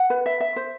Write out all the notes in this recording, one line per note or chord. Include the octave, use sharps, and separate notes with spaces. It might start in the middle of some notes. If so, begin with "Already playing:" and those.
Already playing: F#5
B4
E5
E5
C5